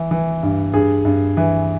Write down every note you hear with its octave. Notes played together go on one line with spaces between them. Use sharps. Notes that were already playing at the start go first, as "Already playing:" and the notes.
Already playing: E3
E3
G2
G2 G#4
G2
E3